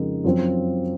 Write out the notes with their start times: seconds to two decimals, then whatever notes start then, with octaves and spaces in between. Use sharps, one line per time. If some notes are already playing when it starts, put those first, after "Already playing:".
Already playing: F2 C#3 G#3 D#4 A#4
0.24 F#2 F3 C4 F4